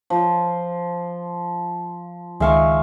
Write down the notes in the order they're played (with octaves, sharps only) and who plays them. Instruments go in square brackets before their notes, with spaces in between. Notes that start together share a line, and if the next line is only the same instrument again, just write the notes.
[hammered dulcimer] F3
[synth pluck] C#2 D#3 E5 [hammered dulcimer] G#3 F5 C#6